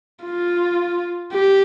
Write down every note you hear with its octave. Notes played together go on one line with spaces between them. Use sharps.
F4
G4